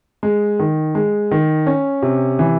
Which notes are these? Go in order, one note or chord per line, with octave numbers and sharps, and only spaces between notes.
G#3
D#3
G#3
D#3
C#4
C3
E3